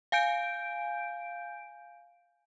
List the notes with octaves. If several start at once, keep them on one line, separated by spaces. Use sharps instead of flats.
F5 G#5 G6 D7